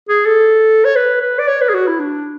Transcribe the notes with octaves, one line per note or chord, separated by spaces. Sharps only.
G#4
A4
C#5
B4
B4
D5
C#5
B4
G#4
F#4
E4
D4